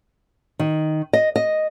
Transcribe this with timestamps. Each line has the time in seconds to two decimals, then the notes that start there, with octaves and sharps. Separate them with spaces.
0.59 D#3
1.13 D#5
1.36 D#5